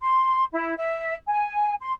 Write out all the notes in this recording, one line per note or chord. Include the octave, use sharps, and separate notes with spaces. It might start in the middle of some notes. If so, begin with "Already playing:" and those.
C6
E4
E5
G#5
C6